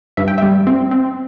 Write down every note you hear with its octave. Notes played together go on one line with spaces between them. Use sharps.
G2 E5
G5
G3 E5
C4
C4